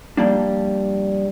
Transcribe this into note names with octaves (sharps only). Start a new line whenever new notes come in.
F3 G3 A#3 D4